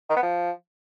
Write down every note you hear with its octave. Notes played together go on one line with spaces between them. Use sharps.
D#3
B3
F3